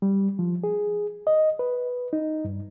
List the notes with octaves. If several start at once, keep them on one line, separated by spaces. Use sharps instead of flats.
G3
F3
G#4
D#5
B4
D#4
G2